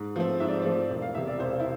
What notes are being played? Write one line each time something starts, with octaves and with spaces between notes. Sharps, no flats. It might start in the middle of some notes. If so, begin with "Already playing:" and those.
Already playing: G#2
F3 A3 C4
G#2 E5
D5
C5
F3 A3 C4 D5
E1
F5
E2 C3 E5
D5
E1 C5
E4